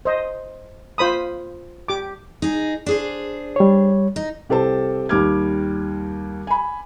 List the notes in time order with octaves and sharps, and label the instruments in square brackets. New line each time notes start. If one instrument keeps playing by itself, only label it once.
[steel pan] C5 D#5
F4 C5 B5 D#6
G4 D6
[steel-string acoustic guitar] D#4 G#4
D4 G#4 C5
[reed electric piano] G3 C#5
[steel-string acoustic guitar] D#4
[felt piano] C2 G4 A4 C5 A5
D#2 G3 G4 D6 F6 G#6
G#5 B5